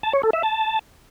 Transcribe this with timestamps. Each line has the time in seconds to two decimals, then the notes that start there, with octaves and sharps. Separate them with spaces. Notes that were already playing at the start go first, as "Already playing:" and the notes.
0.03 A5
0.13 C#5
0.23 A4
0.33 E5
0.43 A5